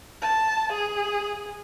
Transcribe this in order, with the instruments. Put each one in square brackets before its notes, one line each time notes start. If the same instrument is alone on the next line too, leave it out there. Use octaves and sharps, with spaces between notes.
[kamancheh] A5
G#4